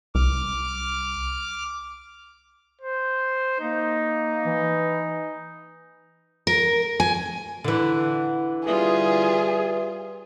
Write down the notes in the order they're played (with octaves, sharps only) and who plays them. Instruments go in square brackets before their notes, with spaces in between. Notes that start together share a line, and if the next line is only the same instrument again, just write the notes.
[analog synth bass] C2 [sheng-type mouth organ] D6 F6
[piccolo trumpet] C5
[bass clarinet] A#3 [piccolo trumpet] D#4
[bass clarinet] E3
[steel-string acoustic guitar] A#4
G#5
[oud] D3 E3
[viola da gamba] G3 F4 [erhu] G#4 [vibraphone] B4 E5 D#6